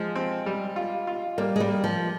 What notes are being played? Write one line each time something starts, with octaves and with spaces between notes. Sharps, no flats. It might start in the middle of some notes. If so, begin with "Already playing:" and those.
Already playing: F3 G#3
C4
G3
F4
F4
G3 A#3
G#3
G3
A#3
F3